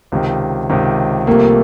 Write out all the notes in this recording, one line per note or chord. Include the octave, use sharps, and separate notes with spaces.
C#2 C3 D#3
C#2 C3 D#3
C2 C3 F3 A3 A#3